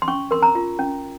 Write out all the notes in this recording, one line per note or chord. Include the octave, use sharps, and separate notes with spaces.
C6
C#4 C#6
A#4 C6
A#5
F4
C#4